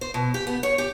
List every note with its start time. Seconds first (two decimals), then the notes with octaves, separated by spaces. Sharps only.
0.01 C5
0.14 B2
0.34 G4
0.47 B3
0.63 C#5
0.78 G4